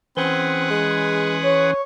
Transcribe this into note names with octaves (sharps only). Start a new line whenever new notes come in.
E3 C4 C#4 G#4 B4 F#5 C6
G#3
C#5